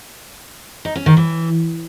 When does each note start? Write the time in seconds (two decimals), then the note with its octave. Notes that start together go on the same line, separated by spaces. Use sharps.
0.85 D#4
0.96 C#4
1.06 D#3
1.17 E3